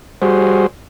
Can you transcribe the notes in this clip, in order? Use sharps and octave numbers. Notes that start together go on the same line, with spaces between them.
G3 F#4 G#4 C5